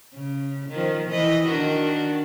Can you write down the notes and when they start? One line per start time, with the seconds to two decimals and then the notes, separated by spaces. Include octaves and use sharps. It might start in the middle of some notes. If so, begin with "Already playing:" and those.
0.13 C#3
0.69 D#3 F3
1.09 E3 D#5
1.47 D#3 D4 F#4